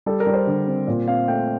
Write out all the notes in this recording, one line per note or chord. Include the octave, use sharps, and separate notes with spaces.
G3 A4
A#4
G3
C5
D3
C4
A#2 C5
C4 F5
A3 G5